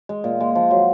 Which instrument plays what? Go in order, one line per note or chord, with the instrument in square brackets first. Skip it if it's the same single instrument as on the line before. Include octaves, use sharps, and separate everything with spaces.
[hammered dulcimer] G#3
A#2
G#3
F3
F#3